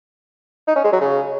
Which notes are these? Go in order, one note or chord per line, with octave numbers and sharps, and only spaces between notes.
D#4
C#4
G#3
F#3
C#3